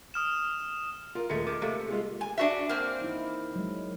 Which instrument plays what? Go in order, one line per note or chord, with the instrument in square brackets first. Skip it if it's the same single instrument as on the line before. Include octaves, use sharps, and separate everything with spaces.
[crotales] D#6 F6 E7
[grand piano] F4 A#4
[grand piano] D#1 C#7 [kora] G#3 A3
[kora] D#3 [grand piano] D6
[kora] C3 A3 A#3
[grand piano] G#3 F4 G#4
[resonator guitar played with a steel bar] G#5
D4 F#4 E5
A#3 C4
[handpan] D#4 E4
F#3 G#3